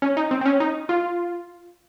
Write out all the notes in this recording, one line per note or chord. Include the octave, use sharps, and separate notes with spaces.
C#4
D#4
C4
C4
C#4
D#4
F4